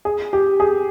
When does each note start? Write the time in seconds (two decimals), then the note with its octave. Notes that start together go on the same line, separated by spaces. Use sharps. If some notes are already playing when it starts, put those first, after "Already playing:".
0.05 G#4
0.33 G4
0.60 G#4